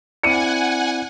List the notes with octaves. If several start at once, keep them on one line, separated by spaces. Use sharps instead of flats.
C4 E4 D5 F#5 G#5 C#7 D#7